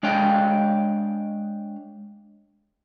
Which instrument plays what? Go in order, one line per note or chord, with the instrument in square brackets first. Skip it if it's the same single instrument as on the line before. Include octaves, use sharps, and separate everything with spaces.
[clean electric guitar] G#3 D4 C#5 F5 G5